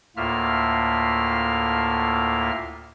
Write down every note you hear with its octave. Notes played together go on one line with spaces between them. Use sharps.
D2 A2 A#3 F4 E5 F6